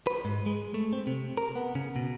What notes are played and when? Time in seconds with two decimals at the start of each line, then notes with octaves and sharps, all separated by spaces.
0.07 B4
0.25 G#2
0.46 G#3
0.74 A3
0.93 C4
1.07 C3
1.37 A#4
1.56 B3
1.75 C#3
1.96 B2